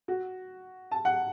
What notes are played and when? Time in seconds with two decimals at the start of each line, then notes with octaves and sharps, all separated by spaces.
0.08 F#4
0.91 A5
1.05 F#5